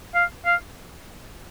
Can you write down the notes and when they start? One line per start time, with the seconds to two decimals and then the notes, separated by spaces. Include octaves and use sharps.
0.14 F5
0.45 F5